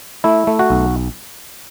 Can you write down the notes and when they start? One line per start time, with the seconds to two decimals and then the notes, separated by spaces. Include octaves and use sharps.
0.24 A3 E4
0.47 A3
0.59 F#4
0.70 B1